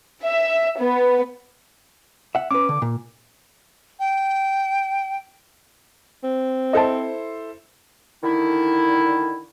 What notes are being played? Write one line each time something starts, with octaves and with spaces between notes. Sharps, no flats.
E5
B3
E5 F#5
C#4 B4 D6
D3
A#2
G5
C4
E4 A4 C5 D#5 A5
D3 D#3 E4